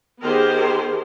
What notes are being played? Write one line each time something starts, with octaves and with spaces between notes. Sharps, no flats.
D#3 B3 G4 G#4 A#4 C5